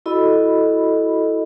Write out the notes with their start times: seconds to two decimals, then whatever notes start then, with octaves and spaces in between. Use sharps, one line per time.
0.06 E4 F#4 A4 D#5 B5